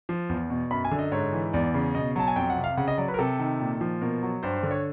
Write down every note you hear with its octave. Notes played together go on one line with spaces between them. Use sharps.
F3
E2
B2
F#2 B5
G#5
D3
D#5
G#2 C#5
E3
E2 D5
C#3
B2 D#5
F#3 A5
G#5
F2 G5
F#5
C3
F5
C#3 F#5
D#5
F#3 D5
B4
A#4
C3 A4
D#3
A#2
F3
B2 A#4
F#3
G2 C5
C5
D3
C#5